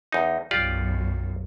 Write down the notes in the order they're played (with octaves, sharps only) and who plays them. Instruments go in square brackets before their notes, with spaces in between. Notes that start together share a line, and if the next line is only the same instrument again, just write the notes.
[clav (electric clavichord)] E2 D#4
[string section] B1 F#2 [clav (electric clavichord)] F4 G4 D5